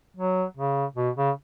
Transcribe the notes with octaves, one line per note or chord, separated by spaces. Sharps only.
F#3
C#3
B2
C#3